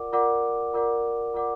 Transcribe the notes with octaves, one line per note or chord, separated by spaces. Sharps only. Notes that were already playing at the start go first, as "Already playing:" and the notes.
Already playing: F4 A#4 D5 F#5 D6
F4 A#4 D5 F#5 D6
F4 A#4 D5 F#5 D6
F4 A#4 D5 F#5 D6